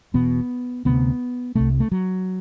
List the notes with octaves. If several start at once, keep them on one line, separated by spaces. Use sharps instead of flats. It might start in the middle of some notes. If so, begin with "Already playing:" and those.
E1 E2 B2 B3
D2 C3 B3
C2 C3 A3
A3
F#3